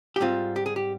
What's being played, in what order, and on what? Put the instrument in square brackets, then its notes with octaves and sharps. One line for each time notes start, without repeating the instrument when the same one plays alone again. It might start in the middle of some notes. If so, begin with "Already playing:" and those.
[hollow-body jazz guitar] G4
G#2 G3 C4 F4
G4
G#4
G4